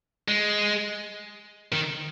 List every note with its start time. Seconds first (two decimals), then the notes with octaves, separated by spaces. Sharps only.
0.28 G#3
1.72 D#3